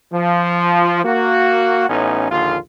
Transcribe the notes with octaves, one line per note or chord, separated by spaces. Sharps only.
F3
A#3 F#4
A1 A2 B3 C#4 D#4
A#1 D#2 D3 F4